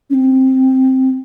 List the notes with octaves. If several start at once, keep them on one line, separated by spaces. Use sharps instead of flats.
C#4
C4